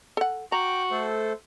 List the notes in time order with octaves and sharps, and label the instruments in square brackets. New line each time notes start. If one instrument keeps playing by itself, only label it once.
[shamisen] A4 F#5
[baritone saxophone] F#4 [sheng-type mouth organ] G5 D6 [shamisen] A#5
[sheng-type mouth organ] A3 A4 C5